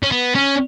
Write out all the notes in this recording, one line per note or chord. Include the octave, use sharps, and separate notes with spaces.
C#4
B3
C#4